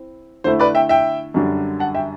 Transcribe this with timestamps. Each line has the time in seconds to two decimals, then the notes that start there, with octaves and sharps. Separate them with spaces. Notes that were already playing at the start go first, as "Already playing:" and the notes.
Already playing: C4 E4
0.44 D3 A3 E4 C5
0.59 B4 D5
0.75 E5 G5
0.89 E5 G5
1.34 F#2 D3 G3 D4
1.79 F#5 A5
1.95 E5 G5